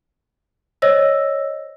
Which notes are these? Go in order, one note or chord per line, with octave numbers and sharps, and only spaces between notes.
C5 C#5 D#5 E6 A#6